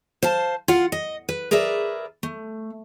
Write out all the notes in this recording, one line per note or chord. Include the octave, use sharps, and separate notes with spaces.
C5 F5 A5
F4 F5 F#5
D#5
B4
G#4 A#4 B4 D5 E5
A3